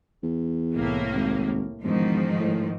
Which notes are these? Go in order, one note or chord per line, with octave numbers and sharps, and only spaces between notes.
E2
C2 A2 A#3
G#1
E1 G#2 D#3 F3
A2